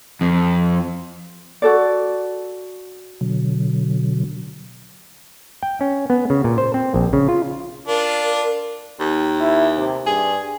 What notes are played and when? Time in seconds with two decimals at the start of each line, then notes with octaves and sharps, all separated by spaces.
0.21 F2
1.62 F#4 A4 D5
3.21 B2 D3 F#3
5.63 G5
5.81 C#4
6.10 B3
6.30 C#3
6.44 A#2
6.58 C5
6.74 C4
6.94 A#1
7.13 C#3
7.29 F4
7.88 D4 F4 A#4
9.00 D#2
9.41 E4
9.77 C3
10.07 G2 G#4